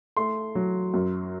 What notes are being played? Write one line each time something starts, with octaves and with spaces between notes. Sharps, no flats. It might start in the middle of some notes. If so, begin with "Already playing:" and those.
A3 C6
F#3
F#2